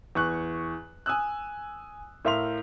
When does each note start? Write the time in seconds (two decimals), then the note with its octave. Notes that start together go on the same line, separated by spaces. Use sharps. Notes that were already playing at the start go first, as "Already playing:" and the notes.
0.15 E2 C#6 F#6
1.06 G#5 D#6 E6 F#6
2.25 A2 A#4 E5 F5 C6 F7